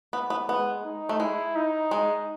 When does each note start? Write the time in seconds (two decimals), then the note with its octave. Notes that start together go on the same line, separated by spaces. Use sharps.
0.13 B3
0.30 B3
0.49 G#3 B3
0.84 D#4
1.09 A3
1.19 G#3 E4
1.56 D#4
1.91 G#3